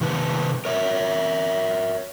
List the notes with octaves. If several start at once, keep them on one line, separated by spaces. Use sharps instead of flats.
C3 D#3 E4 B4 A5
A#4 C#5 E5